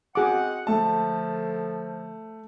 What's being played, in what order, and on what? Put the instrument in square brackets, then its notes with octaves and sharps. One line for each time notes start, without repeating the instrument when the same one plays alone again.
[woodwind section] C4 D#5 F#5 [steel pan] F#4 G#4 D6
[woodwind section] D3 F3 [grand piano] A3 A5